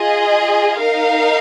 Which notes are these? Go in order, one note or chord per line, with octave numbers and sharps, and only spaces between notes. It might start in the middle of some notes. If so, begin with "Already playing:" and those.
Already playing: F4 G#4 D#5
D#4 A#4 F5